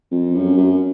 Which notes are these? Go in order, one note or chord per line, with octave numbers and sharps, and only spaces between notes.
F2
F#2
F#2